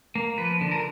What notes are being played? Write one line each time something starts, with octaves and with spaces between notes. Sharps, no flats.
A#3
F3 B4
D3
A#4